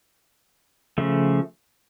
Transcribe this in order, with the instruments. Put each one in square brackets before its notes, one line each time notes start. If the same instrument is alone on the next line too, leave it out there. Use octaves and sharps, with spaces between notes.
[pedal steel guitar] C#3 F3 A3